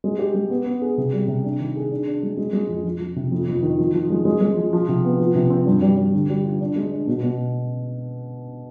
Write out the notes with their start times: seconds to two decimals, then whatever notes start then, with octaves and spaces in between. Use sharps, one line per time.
0.04 G#3
0.19 G4
0.35 G#3
0.50 B3
0.66 B3
0.82 G#4
0.98 C3
1.13 G3
1.28 C3
1.44 D4
1.60 D#3
1.76 G#4
1.91 D4
2.06 D4
2.23 G#3
2.37 G#3
2.53 G#3
2.69 F2
2.84 F3
3.00 F3
3.16 C3
3.32 F2
3.48 F2
3.63 D#3
3.79 F3
3.94 F3
4.10 G#3
4.25 G#3
4.41 G#3
4.57 F3
4.73 F3
4.88 C3
5.05 B3
5.20 F3
5.35 C3
5.50 C4
5.66 G2
5.82 G3
5.98 G3
6.14 D3
6.30 G3
6.45 F4
6.61 D4
6.76 G#3
6.92 D4
7.08 B2
7.23 B2